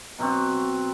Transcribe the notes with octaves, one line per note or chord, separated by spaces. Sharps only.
B2 F#3 C4 F#4